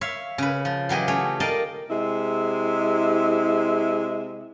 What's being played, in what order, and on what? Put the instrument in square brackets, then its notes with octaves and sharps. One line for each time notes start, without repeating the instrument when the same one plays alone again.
[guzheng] C#5 E5 F5
C#3 B4
F3
E3 F#3 G4 D#5
A3 C#4 G#4
A#4 D5 D#5 F5 G5 A5
[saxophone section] C3 G#3 E4